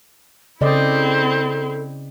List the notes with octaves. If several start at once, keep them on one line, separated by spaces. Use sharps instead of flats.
C#3 C4 E4 A4 D5 D#5